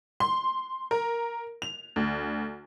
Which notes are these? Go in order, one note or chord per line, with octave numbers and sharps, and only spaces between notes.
C6
A#4
F7
D2